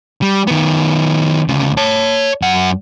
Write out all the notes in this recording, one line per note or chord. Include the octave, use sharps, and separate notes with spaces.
G3
D#3 B3
D2 C#3
C#5 A5
F#2 F#5